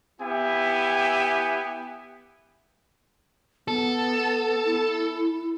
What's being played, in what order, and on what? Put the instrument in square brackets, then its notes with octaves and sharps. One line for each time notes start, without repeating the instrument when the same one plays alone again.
[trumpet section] B3 E4 G4 E5 G#5
[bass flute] B3 [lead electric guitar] A4
[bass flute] E4